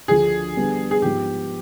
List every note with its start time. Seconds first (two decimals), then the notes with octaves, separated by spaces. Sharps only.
0.08 D2 D3 F3 G#4
0.56 D3 G3 B3 D4
0.91 G#4
1.02 G#2 F3 B3 G4